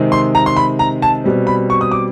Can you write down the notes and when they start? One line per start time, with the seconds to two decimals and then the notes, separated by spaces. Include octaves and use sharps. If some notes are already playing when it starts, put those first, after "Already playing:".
Already playing: C3 D#3 G#3 C4
0.12 C6
0.35 A#5
0.46 C6
0.56 B5
0.79 A#5
1.02 A5
1.24 B2 G3 C4
1.47 B5
1.70 C#6
1.81 D#6
1.91 D6